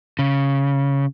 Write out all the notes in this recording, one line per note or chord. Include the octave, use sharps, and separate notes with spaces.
C#3